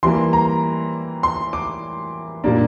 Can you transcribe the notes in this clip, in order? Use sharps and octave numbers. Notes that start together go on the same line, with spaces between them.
E3 G3 A#3 C6
A#5
C6
D6
A#2 G3 A#3 D4